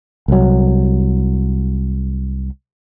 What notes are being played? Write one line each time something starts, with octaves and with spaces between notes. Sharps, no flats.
C2 F#3